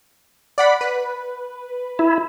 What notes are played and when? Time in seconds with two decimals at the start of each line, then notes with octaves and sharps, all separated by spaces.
0.58 D5 F#5 B5
0.81 B4
1.99 E4